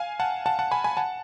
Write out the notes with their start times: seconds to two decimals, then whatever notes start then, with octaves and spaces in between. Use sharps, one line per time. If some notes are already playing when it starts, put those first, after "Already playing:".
Already playing: F5 G#5
0.20 F#5 A5
0.46 F#5 A5
0.59 F#5 A5
0.71 G#5 B5
0.84 G#5 B5
0.97 F#5 A5